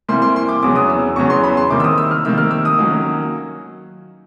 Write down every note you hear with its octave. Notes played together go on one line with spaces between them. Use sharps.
C3 E3 G3 A#3 C6
C6
C6
D6
E2 C#3 F#3 B3 D6
D#6
E6
E2 C#3 F#3 B3 C#6
C6
B5
C6
C3 D#3 G3 A#3 D6
E6
D#6
E6
F6
C3 D#3 G3 A#3 E6
F6
E6
D#6
D#3 F#3 A#3 C#4